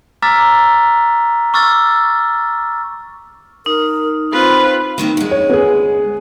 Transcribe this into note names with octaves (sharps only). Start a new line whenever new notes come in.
A#5 D6 E6 F6 A6 B6
C#6 D6 E6 F6 A6
D#4 A#4
C4 F4 B4
D#3 A#3 C4
D2 G#3
C#5
B3 G#4